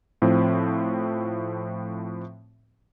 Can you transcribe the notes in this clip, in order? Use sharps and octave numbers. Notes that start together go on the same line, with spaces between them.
A2 F3 C4